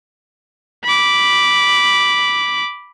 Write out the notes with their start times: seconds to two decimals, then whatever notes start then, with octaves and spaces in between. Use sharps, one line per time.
0.84 B5 D6